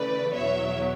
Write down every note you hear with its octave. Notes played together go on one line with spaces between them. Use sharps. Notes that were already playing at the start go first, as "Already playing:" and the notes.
Already playing: C#3 E3 A3 B4 D5
E2 B2 F#3 C#5 E5